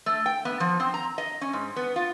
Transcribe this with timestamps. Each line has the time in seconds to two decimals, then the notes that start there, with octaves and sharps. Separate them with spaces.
0.06 A3
0.26 G5
0.45 B3
0.60 F3
0.80 C4
0.94 A#5
1.18 D#5
1.41 C#4
1.53 G#2
1.76 B3
1.96 F4